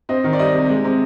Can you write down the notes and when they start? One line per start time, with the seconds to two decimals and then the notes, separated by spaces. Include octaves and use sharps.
0.09 C4 D#5
0.24 D#3
0.33 D5
0.39 G3 D#5
0.54 C3
0.69 G#3
0.84 C3